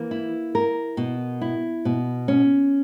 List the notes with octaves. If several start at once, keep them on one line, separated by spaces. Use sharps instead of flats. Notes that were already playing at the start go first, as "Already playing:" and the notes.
Already playing: E3 A#3
E4
A#4
B2
E4
B2
C#4